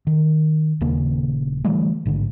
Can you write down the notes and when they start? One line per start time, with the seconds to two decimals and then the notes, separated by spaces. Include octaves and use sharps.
0.07 D#3
0.81 D#1 D#2 C#3 A#3
1.64 D3 E3 G3 A3
2.06 A1 G#2 D3